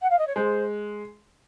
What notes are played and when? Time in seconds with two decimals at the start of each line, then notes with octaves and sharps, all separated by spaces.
0.02 F#5
0.10 F5
0.18 D#5
0.27 C#5
0.35 G#3 C5